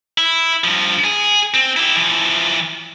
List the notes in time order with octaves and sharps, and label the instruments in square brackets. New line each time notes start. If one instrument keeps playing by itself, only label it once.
[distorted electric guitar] E4
G2 F3
G#4
C4
E4 G4
E3 F3